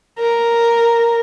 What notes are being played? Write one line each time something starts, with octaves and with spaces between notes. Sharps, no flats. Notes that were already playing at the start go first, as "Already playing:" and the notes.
A#4